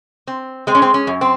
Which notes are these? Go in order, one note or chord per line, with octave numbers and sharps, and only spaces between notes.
C4
G#3 C4
C#4
C4
C#4
F#2
C4